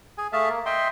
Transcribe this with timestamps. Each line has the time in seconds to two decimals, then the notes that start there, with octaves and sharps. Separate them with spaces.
0.18 G#4 G#5
0.33 A3 G#4 E5 F5 A5
0.49 A#3
0.66 D#5 E5 G5 C6